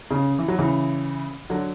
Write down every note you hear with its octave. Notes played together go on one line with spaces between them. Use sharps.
C#3
E3
F#3
C#3 E3
D3 F#3